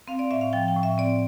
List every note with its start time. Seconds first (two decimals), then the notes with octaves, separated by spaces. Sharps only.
0.08 C4 F5
0.19 D5
0.31 A2 E5
0.41 F5
0.53 F3 G5
0.68 G5
0.76 A2
0.83 E5
0.98 C4 D5